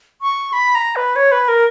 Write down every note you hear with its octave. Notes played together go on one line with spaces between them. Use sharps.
C#6
B5
A#5
B4
C#5
B4
A#4